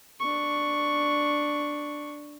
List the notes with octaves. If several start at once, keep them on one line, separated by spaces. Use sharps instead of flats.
D4 C#6